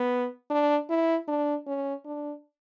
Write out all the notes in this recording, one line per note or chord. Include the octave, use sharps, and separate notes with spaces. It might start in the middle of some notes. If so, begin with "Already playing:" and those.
Already playing: B3
D4
E4
D4
C#4
D4